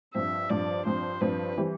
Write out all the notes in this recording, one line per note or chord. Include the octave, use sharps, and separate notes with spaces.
G2 F3 C4 E5
G2 F3 C4 D5
G2 F3 C4 C5
G2 F3 C4 B4
E3 G3 C4